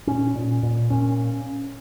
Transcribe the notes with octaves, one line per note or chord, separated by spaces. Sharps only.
A#2 C#4
A#2
A#2
A#2 C#4